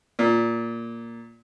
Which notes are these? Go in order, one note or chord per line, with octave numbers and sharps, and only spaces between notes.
A#2